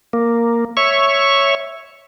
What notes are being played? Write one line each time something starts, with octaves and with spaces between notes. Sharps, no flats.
A#3
C#5 E5 C#6